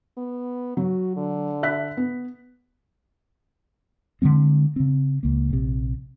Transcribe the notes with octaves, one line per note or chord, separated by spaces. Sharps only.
B3
F#3 F#4
D3
E5 F#6 B6
B3
D3 F3 G#3 C4
C#3 C4
C#2 A#3
A#1 C3